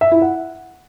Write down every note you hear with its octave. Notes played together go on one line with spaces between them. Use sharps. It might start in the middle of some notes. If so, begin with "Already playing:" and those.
E5
E4
F#5